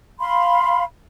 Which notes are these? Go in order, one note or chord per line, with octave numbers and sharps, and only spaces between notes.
F5 B5 C6